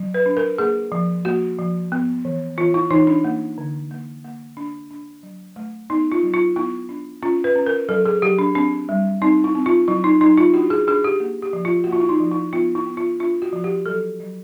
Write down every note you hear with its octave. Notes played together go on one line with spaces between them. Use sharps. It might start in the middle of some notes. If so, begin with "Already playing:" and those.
Already playing: F#3
B4
D4
A#4
A#3 G#4
F3
A#3 F#4
F3
B3
E3
E3 F4
E4
E3 D#4
D4
A#3
D3
A#3
A#3
D4
D4
F#3
A3
B3 D#4
F4
F#3
F4
B3 E4
D4
C#4 F4
B4
C#4
A#4
F#3 A4
G#4
F#3 G4
D4
C4 D4
G3
C4 D#4
E4
C4
F4
F#3 E4
D#4
F#3 D#4
F4
D4 F#4
G#4
D4 G#4
G4
A#3
G4
F3
F4
A#3 F#4
F4
E4
D#4
F3
E4
B3 F4
E4
B3
F4
D4 F4
F#4
F3
G4
F#3 A4
F#3